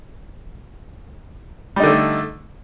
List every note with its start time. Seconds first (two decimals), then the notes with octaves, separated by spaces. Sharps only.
1.76 G3
1.80 D#4
1.83 D3
1.87 A3